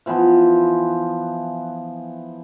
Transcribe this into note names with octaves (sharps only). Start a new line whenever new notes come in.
E3 F3 B3